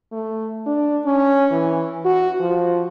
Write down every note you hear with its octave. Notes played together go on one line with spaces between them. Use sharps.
A3
D4
C#4
E3
F#4
F3